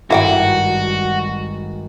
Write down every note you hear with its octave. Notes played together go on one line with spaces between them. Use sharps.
G#1 G2 E4 F#4 F5 G5